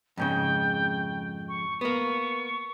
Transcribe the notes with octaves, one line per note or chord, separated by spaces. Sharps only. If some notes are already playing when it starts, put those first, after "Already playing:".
F2 G#2 C#3 G5
C#6
A#3 B3 C#6